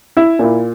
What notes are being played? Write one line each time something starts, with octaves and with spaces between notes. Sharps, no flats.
E4 E5
A#2 A#3 E4